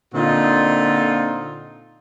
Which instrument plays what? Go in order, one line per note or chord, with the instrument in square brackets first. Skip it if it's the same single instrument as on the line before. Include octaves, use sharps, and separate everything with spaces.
[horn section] A#2 D3 C4 D#4 F4